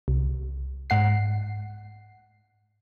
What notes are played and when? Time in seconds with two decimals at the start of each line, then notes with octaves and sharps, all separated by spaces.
0.08 C2
0.90 G#2 F#5 C7